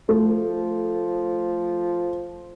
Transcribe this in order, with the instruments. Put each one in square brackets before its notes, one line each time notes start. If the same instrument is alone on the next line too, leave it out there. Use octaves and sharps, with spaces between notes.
[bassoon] F3 [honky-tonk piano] A3